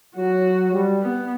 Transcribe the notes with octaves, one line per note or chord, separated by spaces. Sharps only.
F#3 F#4
G3
B3